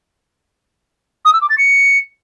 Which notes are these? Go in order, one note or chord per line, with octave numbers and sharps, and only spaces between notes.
D#6
E6
D6
A6
C#7